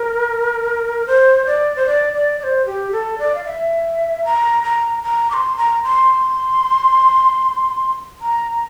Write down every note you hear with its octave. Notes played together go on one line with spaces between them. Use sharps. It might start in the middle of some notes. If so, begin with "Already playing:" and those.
Already playing: A#4
C5
D5
C5
D5
D5
D5
C5
G4
A4
D5
F5
E5
A#5
A#5
A#5
D6
C6
A#5
C6
A#5